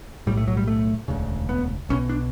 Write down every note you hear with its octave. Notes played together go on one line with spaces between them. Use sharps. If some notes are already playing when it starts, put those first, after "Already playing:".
B1 A2 G3
A3
F#3
G3
A3
E1 D2 C#3
B3
B1 B2 C#4
D4